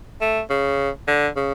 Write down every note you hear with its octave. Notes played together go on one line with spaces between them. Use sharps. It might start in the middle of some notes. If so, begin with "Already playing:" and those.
A3
C#3
D3
C#3